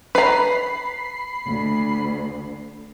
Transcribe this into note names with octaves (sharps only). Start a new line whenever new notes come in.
B4 A#5 B5 C7
D2